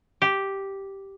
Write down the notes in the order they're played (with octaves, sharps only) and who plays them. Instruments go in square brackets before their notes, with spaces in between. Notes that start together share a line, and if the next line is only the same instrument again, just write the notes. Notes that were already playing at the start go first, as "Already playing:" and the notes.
[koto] G4